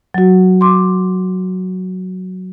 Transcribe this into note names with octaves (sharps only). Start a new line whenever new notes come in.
F#3 F#4
C6 D6